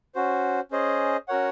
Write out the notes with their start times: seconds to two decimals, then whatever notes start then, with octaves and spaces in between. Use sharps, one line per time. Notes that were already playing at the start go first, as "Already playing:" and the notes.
0.15 C#4 F#4 C5
0.71 C#4 G#4 C5 D#5
1.28 C#4 F#4 A#4 C#5 F#5